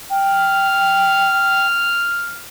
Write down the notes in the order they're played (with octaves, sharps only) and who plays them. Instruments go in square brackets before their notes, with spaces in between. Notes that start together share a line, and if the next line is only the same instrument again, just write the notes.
[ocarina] G5 [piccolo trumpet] F6